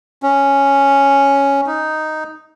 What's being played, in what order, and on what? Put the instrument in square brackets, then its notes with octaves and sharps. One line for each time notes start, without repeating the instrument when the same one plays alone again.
[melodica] C#4
D#4